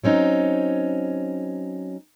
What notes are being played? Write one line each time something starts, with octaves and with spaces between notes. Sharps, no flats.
F#3 C4 C#4 D#4